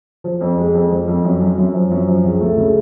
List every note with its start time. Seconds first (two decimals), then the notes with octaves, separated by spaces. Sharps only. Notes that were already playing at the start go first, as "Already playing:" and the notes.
0.24 F3
0.41 F2
0.58 G#3
0.74 F2
0.91 F3
1.08 F2
1.24 F#2
1.41 F#2
1.57 F#2
1.74 F3
1.91 F#2
2.08 F3
2.24 C#2
2.41 A3
2.57 C#3